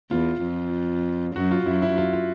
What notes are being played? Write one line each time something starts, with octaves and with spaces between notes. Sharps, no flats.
E2 F4
F2
F#2 F#4
F4
F#2 E4
E4
F4
F4